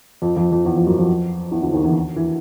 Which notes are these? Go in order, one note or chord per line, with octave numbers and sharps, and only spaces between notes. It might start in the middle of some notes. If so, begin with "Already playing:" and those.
F2 F3
F2 F3
F2 F3
E2 E3
F2 F3
F#2 F#3
F2 F3
E2 E3
D2 D3
D#2 D#3
E2 E3
E3